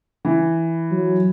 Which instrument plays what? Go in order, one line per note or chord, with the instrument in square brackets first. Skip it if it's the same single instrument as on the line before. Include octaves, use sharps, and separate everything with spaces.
[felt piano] E3
[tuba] F#3